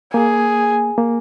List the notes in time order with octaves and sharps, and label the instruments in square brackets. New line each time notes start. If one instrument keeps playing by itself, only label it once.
[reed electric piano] A#3 [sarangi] G#4
[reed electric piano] A#3